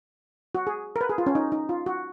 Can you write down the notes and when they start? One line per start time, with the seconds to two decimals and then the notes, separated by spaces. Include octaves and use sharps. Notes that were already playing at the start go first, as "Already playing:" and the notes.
0.55 F#4
0.67 G#4
0.96 A#4
1.01 B4
1.09 G#4
1.18 F4
1.26 C#4
1.35 D#4
1.52 D#4
1.69 F4
1.86 F#4